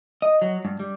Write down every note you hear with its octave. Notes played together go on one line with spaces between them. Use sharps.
D#5
F#3
G2
G3